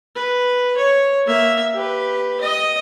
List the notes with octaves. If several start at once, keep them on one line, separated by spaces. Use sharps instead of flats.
B4
C#5
A#3 E5
G4 B4
D#5